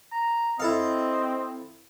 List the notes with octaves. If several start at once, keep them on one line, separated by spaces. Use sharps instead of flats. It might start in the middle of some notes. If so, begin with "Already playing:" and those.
A#5
C4 E4 A4 D#5 F5